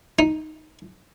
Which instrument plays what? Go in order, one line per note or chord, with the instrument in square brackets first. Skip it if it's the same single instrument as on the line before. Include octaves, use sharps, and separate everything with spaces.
[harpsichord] D#4